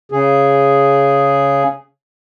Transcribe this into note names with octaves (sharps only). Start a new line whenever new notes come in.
C#3 G#4